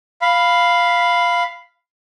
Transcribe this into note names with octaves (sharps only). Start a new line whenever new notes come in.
F5 B5